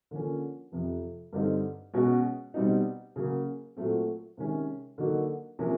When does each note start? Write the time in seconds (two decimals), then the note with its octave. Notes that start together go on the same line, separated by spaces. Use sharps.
0.11 D3 F3 A#3 C#4
0.72 F2 C3 F3
1.33 G2 D3 G3 C4 D#4
1.94 B2 G#3 C#4 F#4
2.54 B2 G3 C4 D#4
3.16 C#3 F#3 A#3
3.77 A#2 F#3 A3 C4
4.37 C3 D#3 G#3 C#4
4.98 D3 F#3 A#3 D#4 F#4
5.59 C3 F3 A#3 C#4